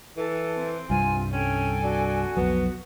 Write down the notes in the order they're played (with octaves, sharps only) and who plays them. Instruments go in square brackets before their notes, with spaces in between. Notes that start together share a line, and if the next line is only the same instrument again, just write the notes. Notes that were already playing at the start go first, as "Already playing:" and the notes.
[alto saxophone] E3 [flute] A4
[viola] C4
[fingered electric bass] C2 G2 [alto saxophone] F4 [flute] G#5
[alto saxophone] C#4 [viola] A4 G#5 [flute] G5
[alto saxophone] D4 [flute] F#4
[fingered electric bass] B1 F2 F#3 [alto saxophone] B3